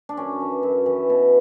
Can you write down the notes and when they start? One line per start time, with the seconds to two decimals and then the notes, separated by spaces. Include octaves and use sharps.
0.09 D4
0.17 F#2 C#4
0.41 E3
0.63 F#2
0.86 E3
1.10 B2